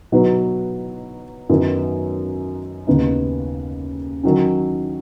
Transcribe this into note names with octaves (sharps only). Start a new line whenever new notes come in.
B2 F#3 D#4 B4
F#2 D#3 F#3 B3
D#2 C#3 B3 D#4
D#3 F#3 C#4